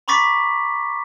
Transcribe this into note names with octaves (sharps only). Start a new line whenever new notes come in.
A#5 B5 C#6 D6 A6 B6